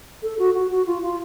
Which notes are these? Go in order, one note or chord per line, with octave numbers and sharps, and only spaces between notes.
A4
F#4
F#4
F#4
F4
F4